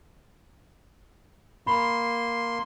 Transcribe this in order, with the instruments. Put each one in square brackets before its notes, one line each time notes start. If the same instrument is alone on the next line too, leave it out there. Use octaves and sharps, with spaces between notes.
[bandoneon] A#3 C6 [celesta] B5